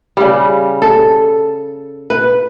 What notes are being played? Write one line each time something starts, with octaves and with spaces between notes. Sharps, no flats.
C#3 G3
A4
B4